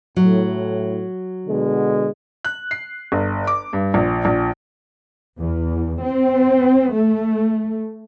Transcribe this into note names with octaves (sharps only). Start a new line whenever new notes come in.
A2 F#3
B2 D3 G#3
F#6
C7
G1
D6
G2
A#1
A#1
E2
C4
A3